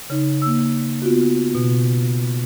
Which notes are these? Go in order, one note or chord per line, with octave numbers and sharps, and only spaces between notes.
C#3 D#4
A#3 E6
B3 F4 F#4
B2